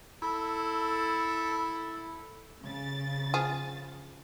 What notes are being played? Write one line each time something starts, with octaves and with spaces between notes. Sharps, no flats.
E4 A4
C#3 A6
F3 G#4